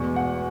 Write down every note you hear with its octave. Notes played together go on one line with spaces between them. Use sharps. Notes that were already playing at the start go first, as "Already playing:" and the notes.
Already playing: E2 B2 G#3 C#6
F#5